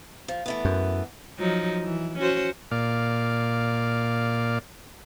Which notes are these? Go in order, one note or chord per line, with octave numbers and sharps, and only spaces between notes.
F3
E3 A3 B3
F#2
F3 F#3 D#4
E3
C#4 F#4 C5
A#2 D5 F5